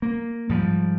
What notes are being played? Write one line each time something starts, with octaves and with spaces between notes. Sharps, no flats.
A#3
G#2 F3 G3